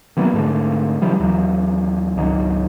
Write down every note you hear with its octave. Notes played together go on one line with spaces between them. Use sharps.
D#3 F#3 A#3 B3
G#2 D3 A3
C#3 E3 F#3 G3
D#2 E3 F#3
G#1 C#2 D#3 F#3